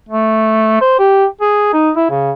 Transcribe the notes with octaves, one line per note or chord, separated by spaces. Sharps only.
A3
C5
G4
G#4
D#4
E4
C#3